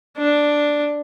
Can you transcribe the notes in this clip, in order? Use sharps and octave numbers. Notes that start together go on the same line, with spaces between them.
D4